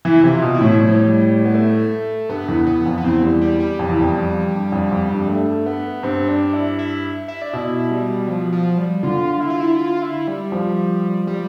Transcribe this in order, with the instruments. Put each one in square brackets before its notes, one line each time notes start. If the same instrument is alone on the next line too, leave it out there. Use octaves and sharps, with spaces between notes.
[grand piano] E3 [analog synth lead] E4
[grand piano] C3
[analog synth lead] F4
[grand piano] B2
[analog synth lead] E4
[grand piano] A2
[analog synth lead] G3
F3
G3
B3
A3
[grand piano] G2 [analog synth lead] B3
[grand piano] E2
[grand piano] E2 [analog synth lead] B3
[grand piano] F2
[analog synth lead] B3
[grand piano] E2 [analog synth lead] C4
[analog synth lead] G3
G3
G3
[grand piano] F2
E2
F2
G2
F2
F2
G2
[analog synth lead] A3
B3
[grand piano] G2 [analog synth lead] C4
[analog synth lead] D4
E4
E4
E4
D4
[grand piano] B2 [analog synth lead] E4
[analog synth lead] G3
F3
F3
G3
[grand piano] D3 [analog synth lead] F4
[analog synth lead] E4
F4
E4
F4
E4
G3
[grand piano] F3
[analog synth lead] G3